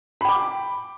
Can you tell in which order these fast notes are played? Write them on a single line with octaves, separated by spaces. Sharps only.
B5 G5 D6